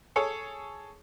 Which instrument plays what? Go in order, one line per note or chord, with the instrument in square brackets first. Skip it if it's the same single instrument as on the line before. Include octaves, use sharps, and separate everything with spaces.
[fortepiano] G#4 A4 C#5